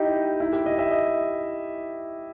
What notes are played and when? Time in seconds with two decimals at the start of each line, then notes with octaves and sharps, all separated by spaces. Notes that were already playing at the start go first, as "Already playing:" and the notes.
Already playing: D#4 E4 G4 D#5
0.40 E4
0.53 G4
0.66 D#5
0.79 E5
0.91 D#5